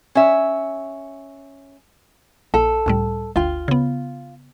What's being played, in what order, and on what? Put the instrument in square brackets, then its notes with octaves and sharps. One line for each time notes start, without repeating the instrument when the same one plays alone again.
[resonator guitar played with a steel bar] C#4 E5
[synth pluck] A#1 [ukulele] A4
[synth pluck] C#2 A2 G3
[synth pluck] G1 D2 G5 [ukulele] F4
[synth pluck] C#3 B3